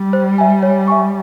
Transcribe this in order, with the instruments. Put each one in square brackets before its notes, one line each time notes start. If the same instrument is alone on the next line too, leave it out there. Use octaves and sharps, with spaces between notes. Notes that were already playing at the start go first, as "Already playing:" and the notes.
Already playing: [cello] G3
[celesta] C5
E5 G#5
C#5
E5 G#5 C#6